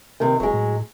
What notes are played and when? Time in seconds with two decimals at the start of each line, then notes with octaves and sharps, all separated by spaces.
0.20 C3 D#3
0.40 E1 F#3 G#3
0.54 A2